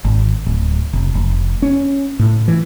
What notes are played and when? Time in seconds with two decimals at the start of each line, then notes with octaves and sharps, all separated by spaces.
0.05 G#1
0.46 D1
0.93 F1
1.14 F1
1.62 C#4
2.19 A2
2.48 E3